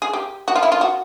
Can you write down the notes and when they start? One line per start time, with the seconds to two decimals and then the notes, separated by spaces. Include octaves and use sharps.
0.02 G#4
0.13 G4
0.48 F#4
0.55 F4
0.63 E4
0.72 F4
0.81 F#4